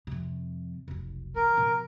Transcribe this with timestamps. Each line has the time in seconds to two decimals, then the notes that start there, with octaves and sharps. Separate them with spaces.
0.07 F2 C3
0.88 F1 B1
1.36 E3 A#4
1.57 B2 F3